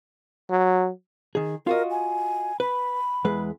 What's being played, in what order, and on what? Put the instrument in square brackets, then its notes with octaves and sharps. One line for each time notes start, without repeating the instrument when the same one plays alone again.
[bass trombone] F#3
[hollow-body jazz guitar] D#3 G#4
[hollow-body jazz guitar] F4 F#4 D#5 [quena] A#4
[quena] G#5
[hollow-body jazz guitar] B4 [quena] B5
[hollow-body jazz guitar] E2 G#3 B4